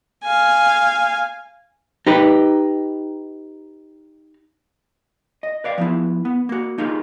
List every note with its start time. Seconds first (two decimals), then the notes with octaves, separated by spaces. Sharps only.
0.24 F5 G#5
2.07 D#4 G4 B4
5.43 D#5
5.64 B4 D5 F5
5.78 F3 B3 E4
6.25 B3
6.49 A#3 F#4
6.78 A#3 D#4 F4 G4 G#4